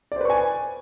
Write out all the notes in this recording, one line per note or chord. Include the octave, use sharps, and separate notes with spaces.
B4 C5 D5 G#5 C#6